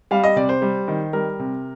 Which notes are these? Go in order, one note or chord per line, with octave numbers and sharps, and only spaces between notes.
G3 F5
D#5
C3 D5
C5
G3
D#3
G3 A#4
C3